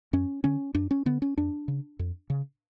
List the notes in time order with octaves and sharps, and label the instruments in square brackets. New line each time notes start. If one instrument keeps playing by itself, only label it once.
[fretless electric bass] F#2 C#4
D3 C#4
F#2 D4
C#4
D3 B3
C#4
F2 D4
C#3
F2
C#3